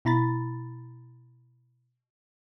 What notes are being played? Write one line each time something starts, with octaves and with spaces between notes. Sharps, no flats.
B2 E4 A#5 B5 A6